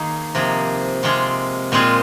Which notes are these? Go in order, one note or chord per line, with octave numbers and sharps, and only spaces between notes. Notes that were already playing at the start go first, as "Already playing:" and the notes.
Already playing: D#3 A#3 D#4 G#4
C3 F3 A#3 G#4
C3 G#3 F4 G#4
A#2 G#3 C4 F4 G#4